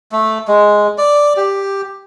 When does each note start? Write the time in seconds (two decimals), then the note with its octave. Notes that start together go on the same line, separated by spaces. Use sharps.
0.12 A3
0.48 G#3
0.98 D5
1.37 G4